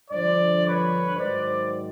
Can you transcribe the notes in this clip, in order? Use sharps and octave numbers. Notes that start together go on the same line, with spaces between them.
G2 D3 F3 C5 D5
B4 C#5
G#2 D#3 F#3 C5 D5